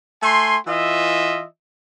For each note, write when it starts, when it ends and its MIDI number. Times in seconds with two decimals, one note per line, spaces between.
0.22 0.57 57
0.22 0.57 80
0.22 0.57 84
0.67 1.44 52
0.67 1.44 65
0.67 1.44 75
0.67 1.44 76